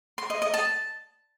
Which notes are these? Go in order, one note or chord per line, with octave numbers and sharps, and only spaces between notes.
C6
D#5
D#5
A5